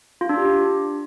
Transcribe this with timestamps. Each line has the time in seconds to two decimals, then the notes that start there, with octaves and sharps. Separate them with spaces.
0.21 F4
0.29 D4
0.38 G4